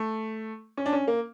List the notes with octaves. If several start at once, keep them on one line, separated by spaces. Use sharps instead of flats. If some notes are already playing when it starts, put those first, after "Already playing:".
Already playing: A3
C#4
D4
C#4
A#3